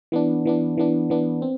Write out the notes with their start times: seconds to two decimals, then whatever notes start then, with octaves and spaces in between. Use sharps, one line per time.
0.12 E3 B3 D4
0.45 E3 B3 D4
0.78 E3 B3 D4
1.10 E3 B3 D4
1.42 C4